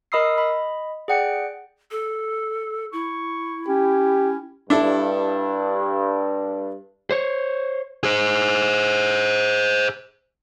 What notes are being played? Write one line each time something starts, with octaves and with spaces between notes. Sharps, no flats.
A#4 D#5 B5 D#6 E6 C7
D#5 B5
G#4 D5 F#5 G5 C#7
A4
E4 C#6
C#4 G4
G2 D4 E4 A4
C5 C#5
G#4 C5